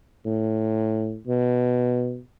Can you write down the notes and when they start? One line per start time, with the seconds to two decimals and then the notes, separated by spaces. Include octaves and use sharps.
0.26 A2
1.27 B2